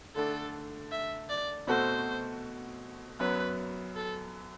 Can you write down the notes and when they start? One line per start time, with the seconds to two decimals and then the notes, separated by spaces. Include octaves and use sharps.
0.15 D3 A3 D4 A4
0.92 E5
1.30 D5
1.67 B2 A3 C4 F#4 A4 C5
3.20 F#2 F#3 B3 B4
3.97 A4